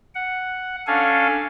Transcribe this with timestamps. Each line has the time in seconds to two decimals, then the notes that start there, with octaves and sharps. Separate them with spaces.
0.15 F#5
0.87 C#4 D4 A4 F5 G#5